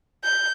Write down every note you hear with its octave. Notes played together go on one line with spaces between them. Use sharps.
G6